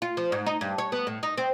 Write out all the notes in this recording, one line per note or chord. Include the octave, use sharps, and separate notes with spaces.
F4
F3
G#2
D#4
G2
C#5
B3
A2
D#4
C4